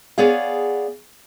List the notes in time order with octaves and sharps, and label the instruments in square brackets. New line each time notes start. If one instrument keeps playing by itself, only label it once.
[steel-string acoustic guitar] B3 G#4 C#5 D5 F5